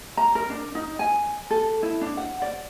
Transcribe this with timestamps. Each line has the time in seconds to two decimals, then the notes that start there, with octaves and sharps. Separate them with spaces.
0.17 A#5
0.35 A#4
0.50 D4
0.75 D#4
0.99 G#5
1.51 A4
1.83 E4
2.01 D4
2.17 F#5
2.42 D5